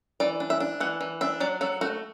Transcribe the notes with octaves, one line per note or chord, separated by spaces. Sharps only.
E3 D5
D4
E5
D4
E3 F#5
E3
D4 E5
F#3 D5
F#3 A4
A3 F#4